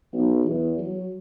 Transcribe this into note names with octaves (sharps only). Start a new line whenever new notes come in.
B1
E2
F#3